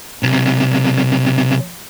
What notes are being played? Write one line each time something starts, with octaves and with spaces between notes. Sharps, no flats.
B1 C3